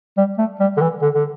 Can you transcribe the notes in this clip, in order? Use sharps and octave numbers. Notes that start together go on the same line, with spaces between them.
G3
A3
G3
D3
E3
D3
D3